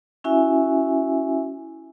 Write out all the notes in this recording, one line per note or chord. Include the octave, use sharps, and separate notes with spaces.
C#4 E4 F#4 E5 G#5